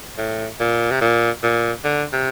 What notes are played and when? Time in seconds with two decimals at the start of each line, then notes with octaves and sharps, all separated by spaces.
0.18 A2
0.60 A#2
0.91 C3
1.01 A#2
1.43 A#2
1.85 D3
2.13 C3